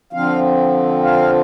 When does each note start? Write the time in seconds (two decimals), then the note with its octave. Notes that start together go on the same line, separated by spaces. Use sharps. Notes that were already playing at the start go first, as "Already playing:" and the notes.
0.13 D3 F3 C4 F5
1.03 F5